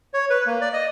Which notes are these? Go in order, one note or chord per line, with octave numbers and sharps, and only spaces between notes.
C#5
B4
A#3
D5
D#5